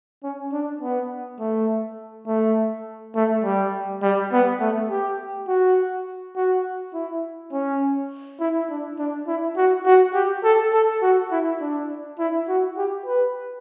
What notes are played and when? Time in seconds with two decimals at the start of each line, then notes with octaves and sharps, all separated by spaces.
0.24 C#4
0.52 D4
0.82 B3
1.40 A3
2.27 A3
3.15 A3
3.44 G3
4.03 G3
4.32 B3
4.61 A3
4.90 G4
5.48 F#4
6.36 F#4
6.94 E4
7.53 C#4
8.40 E4
8.70 D4
8.99 D4
9.27 E4
9.57 F#4
9.86 F#4
10.14 G4
10.44 A4
10.73 A4
11.02 F#4
11.32 E4
11.61 D4
12.19 E4
12.49 F#4
12.78 G4
13.06 B4